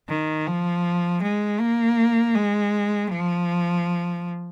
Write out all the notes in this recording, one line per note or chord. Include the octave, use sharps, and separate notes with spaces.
D#3
F3
G#3
A#3
G#3
F3